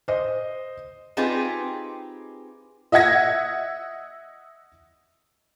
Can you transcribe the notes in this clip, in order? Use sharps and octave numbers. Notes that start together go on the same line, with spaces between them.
C5 D#5
C4 D#4 F4 G4 G#4 B4
D#5 E5 F#5 G#6 A#6